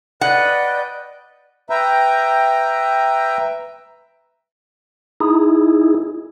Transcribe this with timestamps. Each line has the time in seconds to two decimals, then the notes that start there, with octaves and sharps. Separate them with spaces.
0.21 B4 D5 D#5 F#5 G5 F#6
1.70 B4 E5 G5 A#5
5.20 D#4 E4 G#4